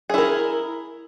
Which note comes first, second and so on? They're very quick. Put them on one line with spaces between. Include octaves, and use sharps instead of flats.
G#4 E4 A#4